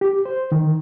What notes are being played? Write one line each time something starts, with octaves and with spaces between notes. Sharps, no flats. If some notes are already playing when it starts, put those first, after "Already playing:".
G4
C5
D#3